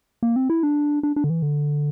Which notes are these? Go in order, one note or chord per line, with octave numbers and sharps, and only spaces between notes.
A#3
C4
E4
D4
D4
D4
D3
E3
D3